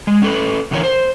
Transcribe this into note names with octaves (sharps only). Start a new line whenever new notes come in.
G#3
C#4 A4 B4
E2 D3 E3 A#4 C#5
C5